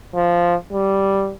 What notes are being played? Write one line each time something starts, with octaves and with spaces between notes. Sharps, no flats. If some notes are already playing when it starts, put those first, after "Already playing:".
F3
G3